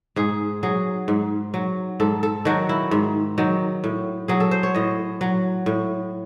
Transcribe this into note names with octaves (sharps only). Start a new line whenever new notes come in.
G#2 G#4
F#3 G#4
G#2
F#3
G#2 A4
A4
D#3 F#3 F#4
E4
G#2
D#3 F#3
A2
F#3 G#4
A4
C5
C#5
A2 D#5
F#3
A2